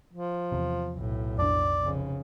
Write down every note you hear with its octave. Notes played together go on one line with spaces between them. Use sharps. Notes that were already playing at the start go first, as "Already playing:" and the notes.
F3
E2 C3
B1 A2
F2 D4 D5
F1 C#3